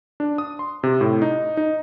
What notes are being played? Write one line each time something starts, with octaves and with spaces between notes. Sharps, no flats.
D4
D#6
C6
C3
A2
D#4
D#4